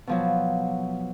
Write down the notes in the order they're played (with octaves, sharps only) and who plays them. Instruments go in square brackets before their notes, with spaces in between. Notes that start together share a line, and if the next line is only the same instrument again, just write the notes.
[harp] B2 F3 F#3